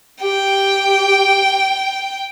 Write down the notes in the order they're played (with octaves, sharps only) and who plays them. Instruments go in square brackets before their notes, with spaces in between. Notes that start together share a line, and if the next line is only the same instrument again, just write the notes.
[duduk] G4 [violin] G5